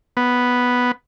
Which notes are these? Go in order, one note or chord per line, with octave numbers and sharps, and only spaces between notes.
B3